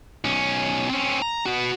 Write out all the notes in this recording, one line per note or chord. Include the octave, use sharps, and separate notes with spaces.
B1 C#4
C4 C#4
A#5
B3 F#4